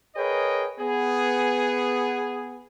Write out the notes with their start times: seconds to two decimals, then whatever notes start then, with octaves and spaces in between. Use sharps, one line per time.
0.16 G#4 A#4 B4 C#5 D#5 G5
0.80 B3 G#4